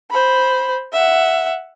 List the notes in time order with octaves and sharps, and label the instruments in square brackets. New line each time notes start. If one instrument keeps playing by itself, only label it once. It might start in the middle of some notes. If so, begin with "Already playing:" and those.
[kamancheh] C5 B5
E5 F#5